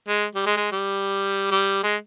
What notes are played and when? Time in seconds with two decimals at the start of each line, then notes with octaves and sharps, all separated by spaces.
0.08 G#3
0.35 G3
0.46 G#3
0.57 G#3
0.72 G3
1.51 G3
1.83 G#3